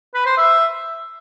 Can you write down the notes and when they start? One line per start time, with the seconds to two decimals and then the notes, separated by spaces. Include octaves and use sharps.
0.14 B4
0.26 C5
0.37 E5